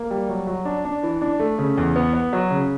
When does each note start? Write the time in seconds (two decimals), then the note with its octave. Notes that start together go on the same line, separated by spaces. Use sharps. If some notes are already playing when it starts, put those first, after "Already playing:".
Already playing: A#3
0.11 G3
0.29 F#3
0.47 F#3
0.65 D4
0.85 D4
1.03 E3
1.21 D4
1.40 A3
1.59 C#3
1.78 E2
1.96 B3
2.14 B3
2.33 F#3
2.51 C#3